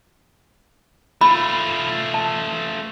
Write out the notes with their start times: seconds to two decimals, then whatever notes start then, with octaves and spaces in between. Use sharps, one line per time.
1.21 A3 F4 B5
2.14 A5